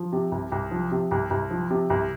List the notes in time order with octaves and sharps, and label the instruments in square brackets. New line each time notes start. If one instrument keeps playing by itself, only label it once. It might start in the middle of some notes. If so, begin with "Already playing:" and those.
Already playing: [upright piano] F3
C3
C2
C2
F3
C3
C2
C2
F3
C3
C2